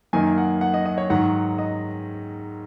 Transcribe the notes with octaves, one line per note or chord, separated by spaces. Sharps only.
F#2 D#3 A#3 D#4 G#5
F#5
F#5
D#5
D#5
C#5
G#2 D#3 F#3 F#5
D#5